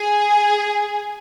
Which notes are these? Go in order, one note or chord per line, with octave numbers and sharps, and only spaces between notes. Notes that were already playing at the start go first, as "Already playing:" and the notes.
Already playing: G#4